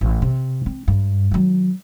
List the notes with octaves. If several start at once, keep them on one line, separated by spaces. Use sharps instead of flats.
A1
C3
C4
G2
D#3 F#3